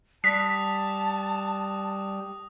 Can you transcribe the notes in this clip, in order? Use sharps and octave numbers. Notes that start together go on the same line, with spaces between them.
G3 A5 D#6 F#6 A#6 B6